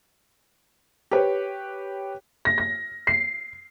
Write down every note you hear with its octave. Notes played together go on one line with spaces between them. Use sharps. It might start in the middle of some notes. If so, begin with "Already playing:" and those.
G4 B4 C#5
A#6
A#6
C7